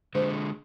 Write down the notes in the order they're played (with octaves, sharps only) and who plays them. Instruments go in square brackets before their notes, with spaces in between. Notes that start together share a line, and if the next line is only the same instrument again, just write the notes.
[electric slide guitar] D3 G#3 [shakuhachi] C5